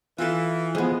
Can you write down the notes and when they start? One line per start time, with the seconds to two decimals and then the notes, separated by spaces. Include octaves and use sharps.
0.18 E3 F4 A4
0.75 F3 G#3 B3 G#4 G#5